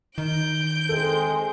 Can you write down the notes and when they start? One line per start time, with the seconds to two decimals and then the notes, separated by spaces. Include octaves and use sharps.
0.18 D#3 G6 D7
0.89 G#3 C4 G#4 A4